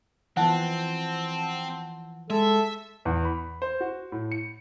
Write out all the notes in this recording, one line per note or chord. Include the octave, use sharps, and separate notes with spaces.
E3 F3 B3 C4 F#5 A5
G#3 A4 E5
E2
B5
C5
F#4
A2
C#7